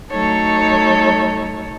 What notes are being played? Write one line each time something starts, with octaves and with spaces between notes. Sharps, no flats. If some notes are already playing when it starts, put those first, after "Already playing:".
F#3 A3 D#4 A4 C#5